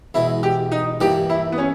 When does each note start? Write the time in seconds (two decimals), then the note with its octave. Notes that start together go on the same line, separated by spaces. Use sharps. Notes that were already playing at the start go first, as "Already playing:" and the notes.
0.14 E2 B2 G#3 E4
0.43 G4
0.72 D#4
1.01 G2 E3 A#3 G4
1.30 E4
1.52 B3
1.58 C#4